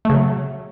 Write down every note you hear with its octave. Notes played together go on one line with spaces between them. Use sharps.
C#3 F#3 A3